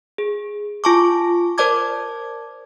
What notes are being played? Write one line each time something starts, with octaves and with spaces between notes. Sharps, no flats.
G#4
F4 G#5 A5 C#6 D6
A#4 C5 D5 A5 D6 G#6